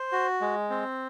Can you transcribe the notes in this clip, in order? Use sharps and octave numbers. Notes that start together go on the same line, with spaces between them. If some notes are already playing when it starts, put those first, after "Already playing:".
Already playing: C5
F#4
G#3
C4